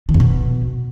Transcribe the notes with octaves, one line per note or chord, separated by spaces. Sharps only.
D#3
F2
B2